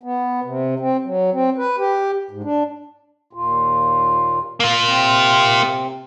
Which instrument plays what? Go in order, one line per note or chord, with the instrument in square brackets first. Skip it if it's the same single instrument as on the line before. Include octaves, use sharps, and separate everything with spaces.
[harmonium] B3
C3
C4
F#3
C4
B4
G4
G#2
D4
D#2 A#2 F4
[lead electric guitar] A#3 F4
[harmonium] C3 C4